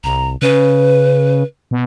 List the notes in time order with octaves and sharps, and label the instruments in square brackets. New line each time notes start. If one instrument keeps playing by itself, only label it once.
[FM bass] C2 [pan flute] A#5
[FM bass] C#3 [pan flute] B4
[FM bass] B2